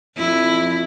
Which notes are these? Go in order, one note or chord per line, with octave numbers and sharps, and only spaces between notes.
F2 E4